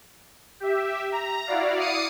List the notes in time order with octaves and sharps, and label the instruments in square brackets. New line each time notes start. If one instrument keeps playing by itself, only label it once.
[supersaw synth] G4 E5
A#5
E4 F#4 D5 F5
D6 D#6 C7 C#7 D#7